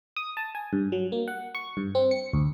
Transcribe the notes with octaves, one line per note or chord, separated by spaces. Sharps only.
D#6
A5
G#5
G2
F#3
A#3
F#5
C#6
G2
C4
C#7
D2